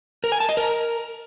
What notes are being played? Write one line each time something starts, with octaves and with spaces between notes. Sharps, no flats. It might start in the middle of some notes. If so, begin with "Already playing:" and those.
A#4
G#5
A5
D#5
A#4